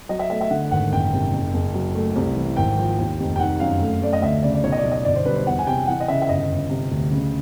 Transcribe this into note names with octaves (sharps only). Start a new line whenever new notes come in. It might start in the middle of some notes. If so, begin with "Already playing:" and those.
F#3 D#5
E5
A3 E5
E5
D3 F#5
G#1 F#5
F#1 G5
C3
F#1
F#1
F#3
A3
C2
E3
G#1 G5
F3
D#2
F1
G5
D#3 F#5
F#2 F5
A3
A3 D5
D#5
D2 E5
C#3 D5
D5
B1 C#5
D#5
D5
B1
D#5
G1 D5
C5
G2 B4
C5
E2 F#5
G#5
C3 G5
E3 F#5
D#5
C#3 E5
E5
G1 D#5
G1
C3
D2
C#3